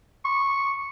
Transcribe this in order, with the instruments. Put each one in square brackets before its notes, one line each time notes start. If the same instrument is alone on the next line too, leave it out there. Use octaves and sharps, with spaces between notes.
[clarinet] C#6